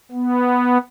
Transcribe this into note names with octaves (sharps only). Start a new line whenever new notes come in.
B3